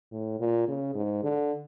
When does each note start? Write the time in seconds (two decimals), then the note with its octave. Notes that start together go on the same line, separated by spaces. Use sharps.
0.11 A2
0.40 A#2
0.68 C#3
0.95 G#2
1.23 D3